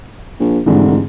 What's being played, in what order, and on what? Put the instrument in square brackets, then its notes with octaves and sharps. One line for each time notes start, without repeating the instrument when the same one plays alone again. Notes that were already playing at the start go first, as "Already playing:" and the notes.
[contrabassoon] A#1
[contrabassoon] F1 [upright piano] G#2 D3 E3